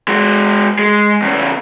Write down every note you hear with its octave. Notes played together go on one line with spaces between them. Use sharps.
G#3 F#4
G#3
E2 C#3